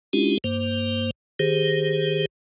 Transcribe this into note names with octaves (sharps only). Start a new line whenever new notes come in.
G#3 C#4 D4 E4 F4 G4
G2 A#3 C5
D#3 G4 G#4 C5